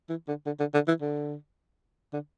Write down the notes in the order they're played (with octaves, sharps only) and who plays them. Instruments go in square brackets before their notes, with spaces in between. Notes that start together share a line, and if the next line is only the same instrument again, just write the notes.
[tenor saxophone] E3
D3
D3
D3
D3
E3
D3
D3